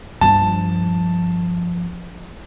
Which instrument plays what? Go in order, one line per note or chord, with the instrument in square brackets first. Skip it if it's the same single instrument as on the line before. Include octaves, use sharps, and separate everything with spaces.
[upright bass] G2 F3 [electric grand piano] A5